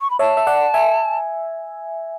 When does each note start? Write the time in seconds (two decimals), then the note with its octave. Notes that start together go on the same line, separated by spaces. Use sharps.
0.01 C#6
0.10 B5
0.19 C#5 E5 A5
0.37 E5
0.47 D5 F#5
0.74 E5 G#5